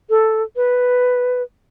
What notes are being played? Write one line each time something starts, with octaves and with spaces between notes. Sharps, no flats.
A4
B4